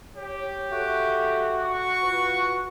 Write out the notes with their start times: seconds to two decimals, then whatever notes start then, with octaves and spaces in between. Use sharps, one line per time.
0.16 G4 C#5
0.71 F#4 A4 E5
1.61 C#6
2.02 F4 B4